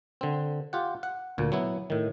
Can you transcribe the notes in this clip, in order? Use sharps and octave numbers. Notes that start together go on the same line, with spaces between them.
D3 C4
F4 G4 F#5
F#5
D2 A#2
F#3 B3 E4
A2 D#3